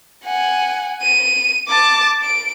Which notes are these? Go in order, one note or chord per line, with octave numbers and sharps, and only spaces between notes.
F#5 G#5
D#7
A5 D6
D7